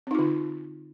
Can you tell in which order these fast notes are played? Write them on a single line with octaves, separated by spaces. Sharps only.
C4 D#4 F4 D3